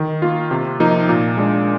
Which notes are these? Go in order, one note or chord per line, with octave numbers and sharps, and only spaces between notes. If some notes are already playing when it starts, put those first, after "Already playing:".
Already playing: D#3
A#3 F4
C3
F3 A#3 D#4
A#2
G#3 D4